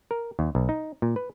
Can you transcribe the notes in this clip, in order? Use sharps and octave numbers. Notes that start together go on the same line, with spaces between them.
A#4
D#2
B1
D#4
A#2
B4